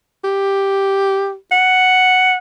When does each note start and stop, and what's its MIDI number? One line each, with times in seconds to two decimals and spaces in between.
0.24 1.35 67
1.52 2.36 78